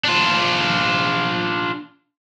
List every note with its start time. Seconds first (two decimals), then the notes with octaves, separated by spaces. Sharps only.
0.05 D4 F4